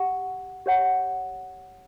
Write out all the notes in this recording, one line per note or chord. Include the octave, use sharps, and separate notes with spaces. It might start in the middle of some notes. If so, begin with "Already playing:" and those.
Already playing: G4 F#5
G4 C#5 F#5